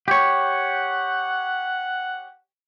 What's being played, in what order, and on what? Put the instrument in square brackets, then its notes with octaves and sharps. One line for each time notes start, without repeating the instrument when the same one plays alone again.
[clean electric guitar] G4 C#5 [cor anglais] F#5